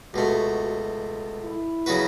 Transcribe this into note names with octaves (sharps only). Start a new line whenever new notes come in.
C#2 B2 A3 F#4
E4
C#3 F#3 B3 F#4 B4